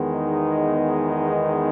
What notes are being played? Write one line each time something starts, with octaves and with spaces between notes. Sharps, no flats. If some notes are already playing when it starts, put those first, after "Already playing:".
Already playing: E2 D#3 G#3 B3
D#4